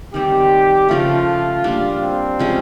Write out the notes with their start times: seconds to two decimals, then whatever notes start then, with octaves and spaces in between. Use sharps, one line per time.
0.14 D#3 G3 C4 G4
0.89 C#3 F3 A3 F4
1.64 G3 A#3 D4
2.02 C4
2.39 C3 F3 G#3 C#4